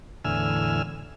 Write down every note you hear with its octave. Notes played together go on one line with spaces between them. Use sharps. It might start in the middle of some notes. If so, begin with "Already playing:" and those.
E2 A2 D3 G#5 E6 F6